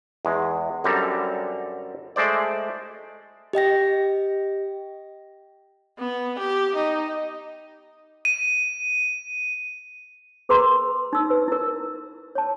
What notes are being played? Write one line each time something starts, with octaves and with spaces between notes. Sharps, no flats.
E2 G#3
F#2 D3 G3 C4 A4 A#5
G#3 A3 C5 D5
G4 D#5 G5 A#6
B3
G4
D#4
D#7
G#4 A#4 B4 A#5 C6
D#4 E6
B4
E4 A#4
C#5 A5